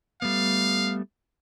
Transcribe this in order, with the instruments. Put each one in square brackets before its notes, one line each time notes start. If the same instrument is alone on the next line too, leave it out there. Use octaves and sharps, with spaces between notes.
[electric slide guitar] G3 A3 B3 [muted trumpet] F5